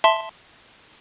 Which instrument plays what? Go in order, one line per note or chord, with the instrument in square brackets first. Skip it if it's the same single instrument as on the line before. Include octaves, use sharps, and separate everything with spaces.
[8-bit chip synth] E5 A5 C6